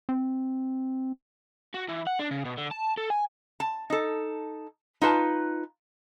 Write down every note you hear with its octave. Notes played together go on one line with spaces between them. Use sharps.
C4
F#4
E3
F#5
D4
C#3
B2
D3
A5
A4
G#5
A5
D#4 A4
D#4 F4 B4 A5